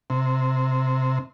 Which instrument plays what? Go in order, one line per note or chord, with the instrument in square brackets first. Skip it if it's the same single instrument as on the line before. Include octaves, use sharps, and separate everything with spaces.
[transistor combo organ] C3